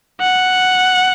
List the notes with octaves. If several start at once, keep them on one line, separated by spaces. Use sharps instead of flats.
F#5